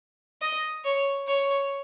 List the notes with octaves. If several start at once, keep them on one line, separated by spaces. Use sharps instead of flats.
D#5
C#5
C#5